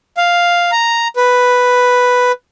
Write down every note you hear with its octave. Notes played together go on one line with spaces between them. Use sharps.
F5
A#5
B4